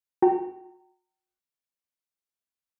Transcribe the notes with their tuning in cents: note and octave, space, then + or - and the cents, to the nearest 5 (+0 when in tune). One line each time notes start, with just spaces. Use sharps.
F#4 -35 G5 -30 A#5 -30